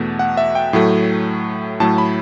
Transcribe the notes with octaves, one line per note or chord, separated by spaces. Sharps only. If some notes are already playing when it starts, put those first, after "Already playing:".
Already playing: E2 B2 A3
F#5
E5
G5
A2 F#3 A3
A2 F#3 A3 A5
B5